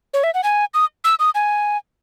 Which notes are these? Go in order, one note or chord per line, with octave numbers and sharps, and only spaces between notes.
C#5
E5
F#5
G#5
D#6
E6
D#6
G#5